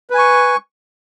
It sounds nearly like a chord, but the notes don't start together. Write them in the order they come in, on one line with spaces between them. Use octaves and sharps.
B4 G#5 C#6